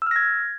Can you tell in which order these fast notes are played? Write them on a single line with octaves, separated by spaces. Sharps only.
E6 F6 A#6 G#6